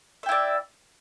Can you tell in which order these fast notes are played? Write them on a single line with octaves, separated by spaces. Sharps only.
E5 G5 E4 D5